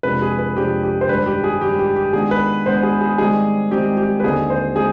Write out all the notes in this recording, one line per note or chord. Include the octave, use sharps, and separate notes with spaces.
F2 C3 F3 G#3 D4 B4
G#4
B4
F2 C3 F3 G#3 D4 G4
G4
C5
G2 D#3 G#3 D4 B4
G4
G#4
G2 D#3 G#3 D4 G4
G4
G4
G#2 D#3 B3 D4 G#4
B4
G#2 D#3 B3 D4 C5
G#4
G#4
G#2 D#3 G3 C4 D#4 G#4
G#2 D#3 G3 C4 D#4 G4
G4
B4
D#2 D3 G#3 C4 D#4 G#4
C5
G#3 C4 D#4 G#4